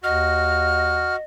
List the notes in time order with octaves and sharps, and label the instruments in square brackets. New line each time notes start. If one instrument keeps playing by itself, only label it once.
[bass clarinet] D#2 [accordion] F#4 [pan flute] D#5 [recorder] F6